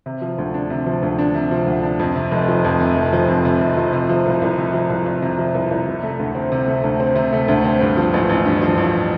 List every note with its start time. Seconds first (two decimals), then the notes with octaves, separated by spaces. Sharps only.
0.06 C3
0.22 F3
0.38 D2
0.54 D4
0.70 C3
0.86 F3
1.02 D2
1.19 D4
1.35 C3
1.51 F3
1.67 D2
1.83 D4
1.99 F2
2.16 C3
2.32 F1
2.48 F3
2.64 F2
2.80 C3
2.96 F1
3.13 F3
3.28 F2
3.45 C3
3.61 F1
3.77 F3
3.93 C3
4.09 F3
4.26 C2
4.42 C2
4.58 C3
4.74 F3
4.90 C2
5.06 C2
5.22 C3
5.38 F3
5.54 C2
5.71 C2
5.87 C3
6.03 A3
6.19 D2
6.35 C4
6.52 C3
6.67 A3
6.84 D2
7.00 C4
7.16 C3
7.33 A3
7.48 D2
7.65 C4
7.81 G2
7.97 F3
8.14 A1
8.29 A1
8.45 G2
8.61 F3
8.78 A1